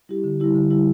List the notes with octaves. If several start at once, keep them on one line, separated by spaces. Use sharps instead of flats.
G3 E4 G4
D3
G3 E4 G4
D3
G3 E4 G4